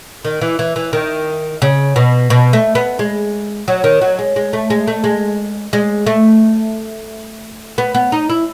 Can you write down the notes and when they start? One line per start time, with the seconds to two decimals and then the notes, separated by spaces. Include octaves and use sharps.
0.25 D#3
0.42 E3
0.59 E3
0.76 E3
0.93 D#3
1.62 C#3
1.96 B2
2.30 B2
2.53 A3
2.75 B3
2.99 G#3
3.68 F#3
3.84 D#3
4.01 F#3
4.19 G#3
4.36 G#3
4.53 A3
4.70 G#3
4.88 A3
5.04 G#3
5.73 G#3
6.07 A3
7.78 B3
7.95 B3
8.12 D#4
8.29 E4